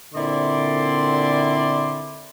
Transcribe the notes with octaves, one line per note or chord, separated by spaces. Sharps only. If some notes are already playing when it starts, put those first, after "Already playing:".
A#2 D3 C4 E4 D5 C6